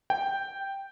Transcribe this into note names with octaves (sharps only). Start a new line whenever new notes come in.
G5